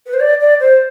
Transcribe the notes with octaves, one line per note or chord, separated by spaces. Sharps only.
B4
C5
D5
D5
C5